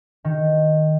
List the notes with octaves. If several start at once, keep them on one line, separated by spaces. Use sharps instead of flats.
D#3